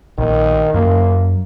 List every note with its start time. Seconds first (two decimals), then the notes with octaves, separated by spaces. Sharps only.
0.18 A#1 D#3
0.74 F#2 A#3